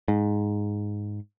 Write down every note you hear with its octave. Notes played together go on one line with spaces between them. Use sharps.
G#2